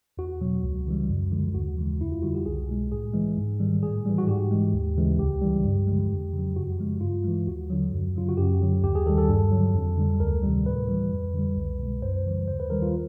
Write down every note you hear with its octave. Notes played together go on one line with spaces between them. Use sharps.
E2 F#4
B2 F#3
C#2
C#3 E3 G3
F#2
D3 F3 G#3
D#2 F#4
C#3 E3 G#3
F2 E4
F4
D3 G3 F#4
G4
C2 G#4
B2 G#3
A2 G#4
E3 G#3
G#2
D#3 G3
A2 G#4
E3 G3
F#4
G#2 G4
E3 G#3
D#2
C#3 E3 G#3
C#2 G4
C#3 E3 G3
G2
D3 F3 G#3
F2
C#3 F#3
F#2 F#4
C#3 F3 G#3
G2 F4
E3 G#3
D#2 F#4
D3 F#3
F#2
C#3 F#3 F4
F#4
F#2 G4
D3 F#3
D#2 G4
G#4
D#3 G3 A4
A4
G2
D3 F#3
F2
D3 G3
D2 A#4
C3 D#3 G3
A2 B4
E3 G3
F2
D3 G3
C2
B2 G#3
F#2 C5
C#3 E3 G3
D#2 C5
B4
D#3 G3 A#4
F4